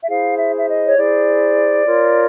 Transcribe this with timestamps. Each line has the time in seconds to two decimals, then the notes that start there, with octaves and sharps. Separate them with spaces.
0.01 E5
0.09 E4 G#4 C5 F5
0.38 E5
0.57 E5
0.68 D#5
0.86 C#5
0.97 E4 G#4 C5 D5
1.85 F4 A#4 C#5